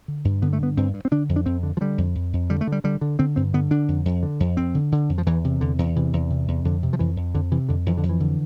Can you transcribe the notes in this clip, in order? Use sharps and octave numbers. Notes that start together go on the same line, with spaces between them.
D3
G2
D3 B3
A3
G2 B3
G2 C4
G2
C4
D3 D4
F2
D4
F2 C4
D3
F3
D3 G3
F2
F2
F2
D3 G3
A3
D3 G3
D3 G3
D3
D3 C4
G2 C4
D3 B3
D3 D4
F2
F2
D3
F2
F2 C4
D3
D3
F2
F3
E2 E3
C3
E2 D3
E2
C3 E3
E2
C3
E2
F2 D3
C3
F3
F2 E3
F2
F2 D3
C3 E3
F2 D3
F2 E3
D3
F2
E3
D3